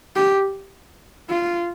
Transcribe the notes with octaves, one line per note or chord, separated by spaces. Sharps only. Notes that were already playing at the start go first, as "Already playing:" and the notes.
G4
F4